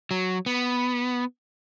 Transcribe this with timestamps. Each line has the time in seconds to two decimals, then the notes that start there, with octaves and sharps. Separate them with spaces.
0.11 F#3
0.46 B3